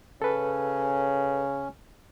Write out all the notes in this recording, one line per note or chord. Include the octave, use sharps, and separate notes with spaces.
C#3 C#4 A4 B4